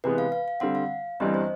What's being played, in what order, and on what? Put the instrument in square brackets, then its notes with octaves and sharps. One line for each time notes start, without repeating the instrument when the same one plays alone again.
[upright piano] C3 E3 G#3 B3 [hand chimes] B4
[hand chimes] F5
F5
F5
[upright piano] D3 G3 C4 [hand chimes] F#5
[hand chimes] F5
[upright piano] G1 G2 E3 G3 C4 [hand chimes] D#5
[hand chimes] C5